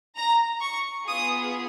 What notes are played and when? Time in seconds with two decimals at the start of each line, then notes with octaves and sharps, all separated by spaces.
0.16 A#5
0.62 C#6
1.07 B3 F4 G#4 D#6